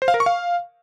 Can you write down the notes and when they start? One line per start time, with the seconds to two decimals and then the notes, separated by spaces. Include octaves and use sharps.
0.02 C5
0.08 F5
0.14 A#4
0.20 C#6
0.26 F5